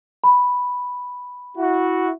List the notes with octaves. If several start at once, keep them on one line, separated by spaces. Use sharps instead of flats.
B5
E4 F#4